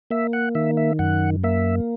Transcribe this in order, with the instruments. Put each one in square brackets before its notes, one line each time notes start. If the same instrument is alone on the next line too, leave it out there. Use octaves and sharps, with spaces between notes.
[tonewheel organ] A#3 E5
F#5
D#3 E5
E5
F#2 F#5
A#3 E5